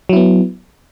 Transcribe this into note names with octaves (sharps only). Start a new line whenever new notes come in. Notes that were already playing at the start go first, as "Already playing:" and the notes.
F#3 B3 E4